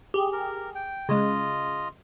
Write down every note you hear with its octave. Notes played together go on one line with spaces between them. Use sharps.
G4 G#4
A#4
G5
C#3 G#3 F4 D#5